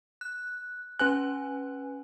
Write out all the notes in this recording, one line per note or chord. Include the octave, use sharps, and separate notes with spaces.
F#6
C#4 B4 G#5 F#6